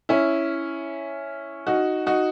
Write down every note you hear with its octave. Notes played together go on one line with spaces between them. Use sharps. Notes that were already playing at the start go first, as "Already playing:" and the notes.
C#4 E4
D#4 F#4
D#4 F#4